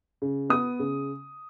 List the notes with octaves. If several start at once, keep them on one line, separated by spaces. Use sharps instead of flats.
C#3
B3 D#6
C#3